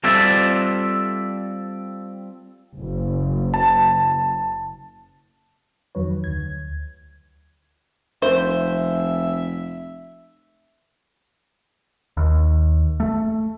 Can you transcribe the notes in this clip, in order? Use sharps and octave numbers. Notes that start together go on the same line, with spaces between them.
G3 C4 F4 A4 D5 E5
F#1
A5
F2 D#3 F#3 B4 C#5
D2 G#6
F1 C5 E5
D#2
A3